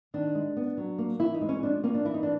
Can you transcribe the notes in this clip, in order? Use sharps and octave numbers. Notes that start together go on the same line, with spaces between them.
D#3 D4
G#3
B3
F#3
A#3
E3 E4
D#4
G#3
C#4
F3 D4
A#3 C#4
D4
E3 E4
D#4
D4